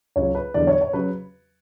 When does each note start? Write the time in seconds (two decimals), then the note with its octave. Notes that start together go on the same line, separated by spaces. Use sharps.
0.16 C#2 C#3 F#3 C#5
0.35 B4
0.54 E2 D3 F#3 D5
0.67 C#5
0.81 C#5
0.93 C#3 F#3 B4